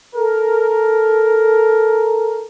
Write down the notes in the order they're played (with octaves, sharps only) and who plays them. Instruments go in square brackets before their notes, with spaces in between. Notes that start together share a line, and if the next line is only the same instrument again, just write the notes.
[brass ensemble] A4 A#4